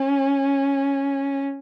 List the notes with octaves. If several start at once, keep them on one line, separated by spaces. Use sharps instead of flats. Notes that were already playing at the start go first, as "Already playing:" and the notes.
Already playing: C#4